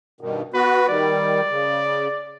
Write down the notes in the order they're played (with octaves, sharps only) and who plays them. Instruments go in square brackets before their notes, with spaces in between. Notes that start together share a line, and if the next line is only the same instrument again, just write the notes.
[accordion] G2 B2 D#3
[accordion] B3 F#4 [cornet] B4
[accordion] D#3 G3 [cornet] D5
[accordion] C#3